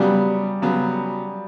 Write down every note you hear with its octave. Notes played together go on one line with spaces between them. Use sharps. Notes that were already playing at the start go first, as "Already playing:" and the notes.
Already playing: C#3 F#3 G3 B3
C#3 F#3 B3